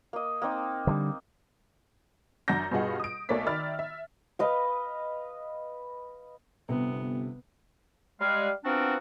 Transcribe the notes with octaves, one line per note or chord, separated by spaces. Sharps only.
A#3 D#5
A#3 C4 D#4
D3 E3 G3
F#2 D4 D5 F#5 G6 A#6
G2 B2 F4 G#4 D#5 F#5
D#6 D7
B1 A3 A#3 C#5 D5 B6
D#3 D5 E5 B5 F6 A6
E5
B4 D#5 F5
G1 C3 B3
G3 G#3 F5
F3 B3 C4 D4 F#4 A#4